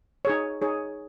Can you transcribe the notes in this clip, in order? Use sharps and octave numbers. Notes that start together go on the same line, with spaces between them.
D#4 G#4 C#5
D#4 G#4 C#5